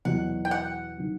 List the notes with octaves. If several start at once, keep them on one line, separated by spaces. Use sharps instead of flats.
E2 B2 F#3 F#5
G5
F#5
D#3 F#3